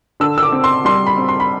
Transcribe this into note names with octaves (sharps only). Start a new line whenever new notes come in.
D3 E6
E6
D6
C4
C6
G3 C6
B5
C4
C6
B5